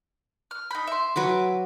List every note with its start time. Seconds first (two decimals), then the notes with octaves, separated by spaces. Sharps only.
0.51 F6
0.71 D#4 B5
0.87 E5 C6
1.16 F#3 B4 D6